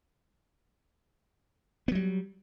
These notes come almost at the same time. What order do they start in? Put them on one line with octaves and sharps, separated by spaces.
B3 F#3 G3